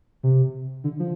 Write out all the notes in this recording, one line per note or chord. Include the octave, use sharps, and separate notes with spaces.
C3
D3
F3